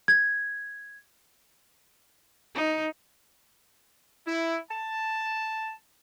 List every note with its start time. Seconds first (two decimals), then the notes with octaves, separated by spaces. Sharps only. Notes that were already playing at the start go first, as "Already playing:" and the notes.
0.08 G#6
2.55 D#4
4.27 E4
4.70 A5